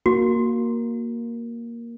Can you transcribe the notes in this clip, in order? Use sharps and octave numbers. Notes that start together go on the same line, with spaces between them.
A#3 F#4